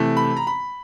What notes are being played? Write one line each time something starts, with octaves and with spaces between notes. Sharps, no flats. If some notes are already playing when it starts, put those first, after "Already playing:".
Already playing: C3 E3 A3
B5
A#5
B5